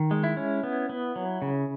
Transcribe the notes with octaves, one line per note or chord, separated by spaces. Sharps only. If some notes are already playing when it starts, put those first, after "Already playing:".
Already playing: D#3
G#3
E4
C#4
B3
B3
F#3
C#3